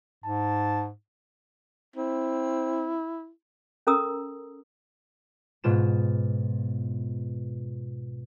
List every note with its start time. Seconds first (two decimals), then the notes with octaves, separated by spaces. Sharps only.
0.24 G#2 A5
1.96 C4 E4
3.87 C#4 A4 A#4 A#5 D#6 E6
5.64 G#2 B2 F4 E7